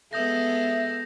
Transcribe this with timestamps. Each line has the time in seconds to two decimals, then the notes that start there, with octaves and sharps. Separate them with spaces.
0.13 G#3 B3 A4 E5 D#6 G6 A#6